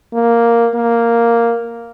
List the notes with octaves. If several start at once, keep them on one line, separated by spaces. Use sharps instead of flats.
A#3
A#3